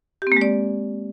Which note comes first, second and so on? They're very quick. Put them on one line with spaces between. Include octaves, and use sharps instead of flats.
G4 C4 A#3 G#3 D5